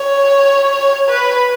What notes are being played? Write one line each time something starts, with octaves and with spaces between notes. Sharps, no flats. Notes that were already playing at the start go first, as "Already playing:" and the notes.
Already playing: C#5
B4